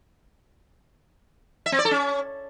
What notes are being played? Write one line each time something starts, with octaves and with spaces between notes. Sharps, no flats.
E5
C4
D5
A4
C#4